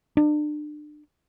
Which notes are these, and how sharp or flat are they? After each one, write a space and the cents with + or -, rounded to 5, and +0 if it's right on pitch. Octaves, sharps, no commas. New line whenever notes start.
D4 +35